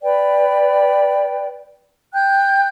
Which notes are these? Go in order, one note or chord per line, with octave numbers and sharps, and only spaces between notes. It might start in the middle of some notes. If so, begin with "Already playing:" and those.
B4 D5 G5
G5 F#6 G6